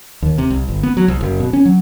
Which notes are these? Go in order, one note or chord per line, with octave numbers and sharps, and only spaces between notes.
D#2
C3
C2
G1
B3
F#3
C2
F#1
B2
C#4
F#3